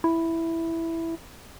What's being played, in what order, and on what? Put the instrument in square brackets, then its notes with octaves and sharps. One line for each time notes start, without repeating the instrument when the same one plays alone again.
[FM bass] E4